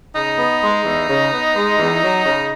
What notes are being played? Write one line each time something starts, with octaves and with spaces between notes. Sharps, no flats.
C#3 D#4
B3
G#3
E2
C#3
B3
G#3
E2
F#3
C#3